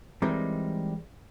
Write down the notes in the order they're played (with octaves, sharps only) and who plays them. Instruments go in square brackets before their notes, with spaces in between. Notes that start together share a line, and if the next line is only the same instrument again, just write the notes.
[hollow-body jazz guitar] E3 G3 G#3 C4 D#4 A#4